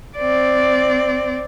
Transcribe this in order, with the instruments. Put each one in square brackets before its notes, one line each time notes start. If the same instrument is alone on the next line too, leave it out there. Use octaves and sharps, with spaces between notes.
[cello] C4 D5